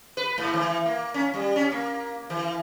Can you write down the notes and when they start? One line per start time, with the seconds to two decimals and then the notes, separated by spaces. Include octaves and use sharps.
0.17 B4
0.38 G#2
0.54 E3
0.86 A#3
1.14 C#4
1.34 G3
1.56 C#4
1.72 A#3
2.30 E3